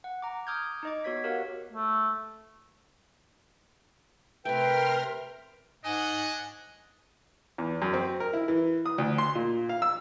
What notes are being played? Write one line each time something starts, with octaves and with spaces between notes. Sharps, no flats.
F#5
A#5 D6
D6 D#6 F6 G6 G#6
D#4 D#5 D6
B3 F#4 C#5 G#6 B6
G4 A#4 C#5 F5 F#5
A3
C3 A3 A#4 B4 G5 C6 F6
G#2 D4 C#5 D#5 F#5 G#5
E2
F#2
C4
A#4
E4
E3
D#6
D2
C6
A#2
F5
E6